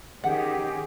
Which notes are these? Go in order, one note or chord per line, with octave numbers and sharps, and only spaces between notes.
D#3 C#4 G4 G#4 F#5